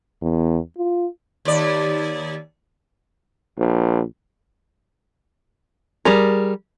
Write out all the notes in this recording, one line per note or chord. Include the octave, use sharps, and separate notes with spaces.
E2
F4
D#2 D5
A#1
G3 G#4 A#4